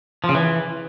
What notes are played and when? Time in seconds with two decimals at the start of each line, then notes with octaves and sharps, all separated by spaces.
0.24 F3
0.29 C#3
0.34 E3